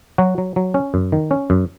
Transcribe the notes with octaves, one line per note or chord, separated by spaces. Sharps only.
F#3 F#4
F#3
F#3
C#4
F#2
D#3
C#4
F#2